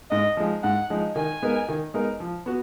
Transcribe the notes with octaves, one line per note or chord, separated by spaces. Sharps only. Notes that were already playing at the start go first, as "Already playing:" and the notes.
G#2 D#5
F3 G#3 D#4
G#2 F#5
F3 G#3 D#4
D#3 G#5
G#3 B3 D#4 A#4
D#3
G#3 B3 D#4 A#4
F3
B3 F#4